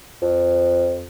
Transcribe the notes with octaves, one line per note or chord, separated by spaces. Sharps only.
F2